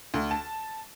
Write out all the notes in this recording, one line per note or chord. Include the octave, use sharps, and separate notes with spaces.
D2
A5